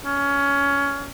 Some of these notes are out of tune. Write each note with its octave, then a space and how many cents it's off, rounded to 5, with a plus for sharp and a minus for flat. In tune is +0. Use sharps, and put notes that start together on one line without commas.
C#4 +20